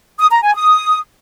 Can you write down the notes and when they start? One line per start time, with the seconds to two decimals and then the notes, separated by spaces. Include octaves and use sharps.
0.19 D#6
0.31 A#5
0.43 G#5
0.55 D#6